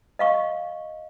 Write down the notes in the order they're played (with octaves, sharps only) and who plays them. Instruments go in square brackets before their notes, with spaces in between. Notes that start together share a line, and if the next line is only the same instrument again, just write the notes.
[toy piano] D#5 F5 C#6